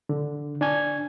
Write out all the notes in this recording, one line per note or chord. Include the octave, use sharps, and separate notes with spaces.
D3
D4 G#5 G#6